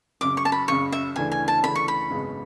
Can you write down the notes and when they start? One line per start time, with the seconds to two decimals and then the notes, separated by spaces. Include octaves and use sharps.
0.21 F#1 F#2 C#3 D6
0.37 C#6
0.45 A5
0.52 B5
0.68 F#1 F#2 C#3 C#6
0.92 E5
1.16 D2 C#3 E3 A3 D4 G#5
1.32 G#5
1.48 A5
1.63 D2 C#3 E3 A3 D4 B5
1.76 C#6
1.88 B5
2.10 G#1 F#2 C#3 G#3 B3